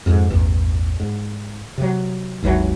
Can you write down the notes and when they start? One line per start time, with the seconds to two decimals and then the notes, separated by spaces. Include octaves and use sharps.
0.06 F2 G#2
0.30 A1 E2 G2
1.00 G#2
1.78 C3 F#3
2.42 G#1 D#2 E3 F#3